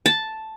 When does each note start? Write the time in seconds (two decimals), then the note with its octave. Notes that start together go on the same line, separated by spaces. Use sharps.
0.06 A5